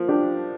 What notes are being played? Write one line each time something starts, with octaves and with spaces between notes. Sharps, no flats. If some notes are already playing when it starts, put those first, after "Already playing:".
Already playing: F3 A#3
D4 G4